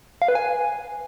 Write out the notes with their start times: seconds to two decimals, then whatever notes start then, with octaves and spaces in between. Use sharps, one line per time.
0.22 F5
0.28 B4
0.35 G#5